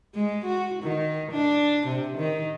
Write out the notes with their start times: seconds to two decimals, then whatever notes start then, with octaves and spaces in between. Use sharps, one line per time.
0.15 G#3
0.45 F#4
0.83 D#3
1.32 D4
1.87 C3
2.17 D#3